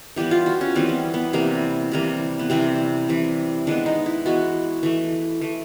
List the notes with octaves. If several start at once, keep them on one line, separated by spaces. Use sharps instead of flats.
E3 G3 B3 G4
F4
F#4
C#4
E3 G3 B3 C4
B3
B3
C3 E3 G3 A#3
C3 E3 G3 A#3
B3
C3 E3 G3 C4
C3 E3 G3
E3 G#3 B3 D4
D#4
E4
E3 G#3 B3 F#4
E3 A3
E3 A3